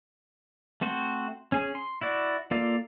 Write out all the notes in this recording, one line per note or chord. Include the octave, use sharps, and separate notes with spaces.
A3 C4 F#4 C5
C#4 G#4
C6
E4 F#4 D5
A#3 F4 A4 D5 F5